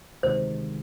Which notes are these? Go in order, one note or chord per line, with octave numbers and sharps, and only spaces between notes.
D2 C3 D#3 G#3 C5